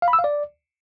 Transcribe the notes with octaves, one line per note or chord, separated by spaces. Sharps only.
F5
B5
E6
F5
D5